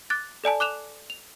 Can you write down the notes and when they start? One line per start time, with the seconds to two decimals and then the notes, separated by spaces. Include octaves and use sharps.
0.10 D6 F#6 A6
0.44 A4 D5 G#5 A5
0.60 D6 F#6 E7 F7
1.10 F7